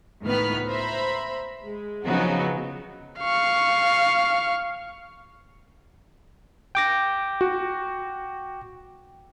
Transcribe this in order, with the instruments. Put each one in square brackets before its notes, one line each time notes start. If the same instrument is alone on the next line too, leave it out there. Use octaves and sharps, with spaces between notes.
[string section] C#2 A2 D#3 B3 B4 F6
C5 E5 A#5 B5
G#3
C#3 F3 F#3 B3 D#4 F#4
[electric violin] F5 C#6
[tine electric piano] G5 D6 A#6
[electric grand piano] F#4